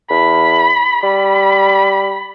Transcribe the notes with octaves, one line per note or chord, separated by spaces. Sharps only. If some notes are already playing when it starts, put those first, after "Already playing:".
E2 B5
G3 B5